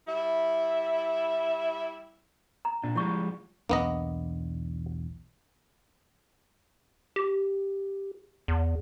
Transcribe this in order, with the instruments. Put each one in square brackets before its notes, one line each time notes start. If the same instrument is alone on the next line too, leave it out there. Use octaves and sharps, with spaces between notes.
[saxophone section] G3 E4 E5
[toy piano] A#5
[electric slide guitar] A#2 D4
[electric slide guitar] F3 G3 G#3 [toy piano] E4 C#6
[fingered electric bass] B1 E2 D4 [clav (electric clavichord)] A#3 B3 D#5
[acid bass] G4
E2